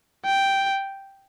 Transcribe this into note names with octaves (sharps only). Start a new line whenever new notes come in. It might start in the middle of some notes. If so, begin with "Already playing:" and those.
G5